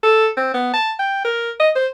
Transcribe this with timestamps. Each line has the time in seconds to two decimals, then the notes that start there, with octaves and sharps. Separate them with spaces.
0.03 A4
0.37 C4
0.54 B3
0.74 A5
0.99 G5
1.25 A#4
1.60 D#5
1.75 C5